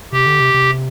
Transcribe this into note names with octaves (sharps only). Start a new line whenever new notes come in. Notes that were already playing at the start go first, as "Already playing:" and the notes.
C3 G4
D3
C3
C3